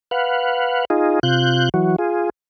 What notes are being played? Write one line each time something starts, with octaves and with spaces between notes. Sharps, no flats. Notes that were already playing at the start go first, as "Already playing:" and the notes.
B4 F5 F#5
D#4 F4 G#4
C3 F4 F#6 G6
E3 F#3 F#4
F4 G#4